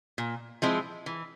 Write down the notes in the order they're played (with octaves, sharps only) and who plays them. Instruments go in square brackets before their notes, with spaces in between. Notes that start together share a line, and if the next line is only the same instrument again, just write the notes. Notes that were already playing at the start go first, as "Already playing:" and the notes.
[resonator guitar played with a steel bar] A#2
F3 G#3 C4 E4
E3